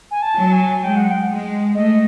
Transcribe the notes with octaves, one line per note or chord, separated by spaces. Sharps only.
G#5
A5
F#3
G#5
G#3 G5
F#5
G5
G#3
A3 D#5